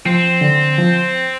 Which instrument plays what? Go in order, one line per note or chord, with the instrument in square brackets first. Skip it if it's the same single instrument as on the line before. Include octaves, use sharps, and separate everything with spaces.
[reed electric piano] F3 [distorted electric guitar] C4
[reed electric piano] D3
F3